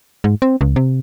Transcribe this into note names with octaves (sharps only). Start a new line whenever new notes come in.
G#2
C4
C#2
C3